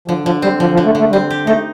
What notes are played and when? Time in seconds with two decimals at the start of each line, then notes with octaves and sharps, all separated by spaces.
0.08 D3 F3
0.25 D3 F3
0.42 G3 C4
0.60 D3 F3
0.73 F3
0.77 D3
0.86 A3
0.95 D3
1.00 A3
1.12 G3 C4
1.30 G4
1.47 A3 D#4